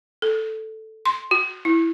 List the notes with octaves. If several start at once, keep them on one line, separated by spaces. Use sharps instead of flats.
A4
C6
F#4
E4